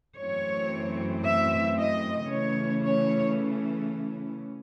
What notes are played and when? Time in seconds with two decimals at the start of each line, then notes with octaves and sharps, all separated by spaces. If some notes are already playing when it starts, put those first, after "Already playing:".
0.18 F#2 E3 A3 C4 C#5
1.25 E5
1.78 D#5
2.31 C#3 E3 A3 C#4 C#5
2.84 C#5